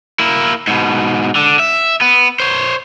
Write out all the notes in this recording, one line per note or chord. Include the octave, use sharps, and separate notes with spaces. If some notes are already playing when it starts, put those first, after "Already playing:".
A#3 E4
G#2 B2
D3
E5
B3
C5 C#5